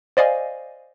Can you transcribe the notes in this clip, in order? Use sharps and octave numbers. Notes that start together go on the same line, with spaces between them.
C5 D5 D#5 F5 G#5